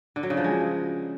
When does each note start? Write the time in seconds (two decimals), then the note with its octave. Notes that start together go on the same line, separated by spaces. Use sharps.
0.16 D3
0.23 F#3
0.30 C#3
0.37 F3
0.44 G#3